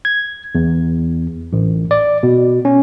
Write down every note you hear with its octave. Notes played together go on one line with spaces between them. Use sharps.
G#6
E2
A1
D5
B2
C#4